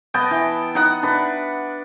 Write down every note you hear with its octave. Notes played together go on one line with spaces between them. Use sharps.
B3 D#5 G5 A5
E3
D#4 F#5
D4 B4